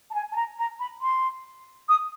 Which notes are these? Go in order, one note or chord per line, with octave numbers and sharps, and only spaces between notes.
A5
G#5
A5
A#5
A#5
B5
C6
D#6